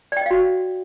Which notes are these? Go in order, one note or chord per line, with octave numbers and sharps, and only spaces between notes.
F#4 D5 D#5 F5 G5